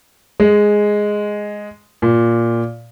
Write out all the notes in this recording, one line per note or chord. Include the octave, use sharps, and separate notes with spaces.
G#3
A#2